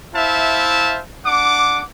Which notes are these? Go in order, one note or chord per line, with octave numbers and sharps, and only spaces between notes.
E4 C5 E5 F5 A5
D4 F#5 D6